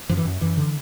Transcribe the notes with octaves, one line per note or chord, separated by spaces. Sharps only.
F#2 F3
E3
F#2
F#2 E3
D3